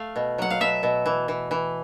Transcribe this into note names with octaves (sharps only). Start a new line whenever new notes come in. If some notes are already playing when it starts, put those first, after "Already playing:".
Already playing: A3 F5
B2
F#3 F#5
F5
B2 E5
B2
E3
E3
E3